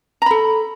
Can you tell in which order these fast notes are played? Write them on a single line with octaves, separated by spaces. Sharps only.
A#5 B5 A4